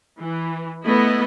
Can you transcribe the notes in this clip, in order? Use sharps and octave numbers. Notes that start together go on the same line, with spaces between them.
E3
A3 B3 E4 D#5